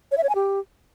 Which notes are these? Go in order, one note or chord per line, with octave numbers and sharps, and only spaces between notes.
C#5
E5
C#5
G#5
G4